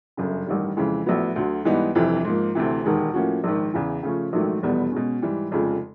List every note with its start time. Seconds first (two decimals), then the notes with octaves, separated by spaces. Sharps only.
0.17 G1 F#2 C#3
0.46 A1 G2 D#3 G3
0.77 F2 C#3 E3 G#3
1.06 A#1 A2 F#3 B3
1.36 D2 D3 F#3
1.65 G#2 E3 G3 B3 D#4
1.95 G1 F2 C3 E3
2.25 G#2 F3 A#3
2.55 D2 C3 E3
2.84 E1 D#2 D#3 G#3
3.14 A2 F3 A#3 C#4 F#4
3.44 A#1 G#2 D#3
3.73 E2 C#3 E3
4.03 C#3 F3 A3 C#4
4.33 A#1 G#2 D#3 F#3 A3
4.62 F1 E2 B2 G3 B3
4.92 B2 G#3 C#4
5.22 G#2 E3 G3
5.51 F1 F2 C#3 F3 G#3